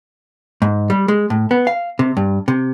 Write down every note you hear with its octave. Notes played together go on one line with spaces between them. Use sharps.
G#2
G3
G#3
A2
B3
F5
C3
G2
C3